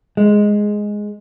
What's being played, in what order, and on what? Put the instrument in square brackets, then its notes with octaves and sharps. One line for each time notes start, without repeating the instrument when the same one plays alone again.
[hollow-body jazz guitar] G#3